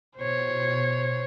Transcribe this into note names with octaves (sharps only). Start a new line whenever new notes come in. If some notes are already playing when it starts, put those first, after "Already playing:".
B2 C5 C#5